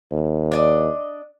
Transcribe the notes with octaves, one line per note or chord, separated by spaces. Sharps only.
D#2
D4 D5 D#5